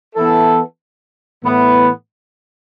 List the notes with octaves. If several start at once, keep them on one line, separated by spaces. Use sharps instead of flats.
E3 B3 E4 A4
A2 E3 B3